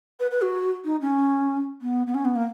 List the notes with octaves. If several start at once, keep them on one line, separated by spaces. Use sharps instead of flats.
B4
B4
F#4
D#4
C#4
B3
B3
C#4
B3
A#3